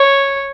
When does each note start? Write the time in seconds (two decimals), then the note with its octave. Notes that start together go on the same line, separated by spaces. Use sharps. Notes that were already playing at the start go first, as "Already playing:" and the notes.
Already playing: C#5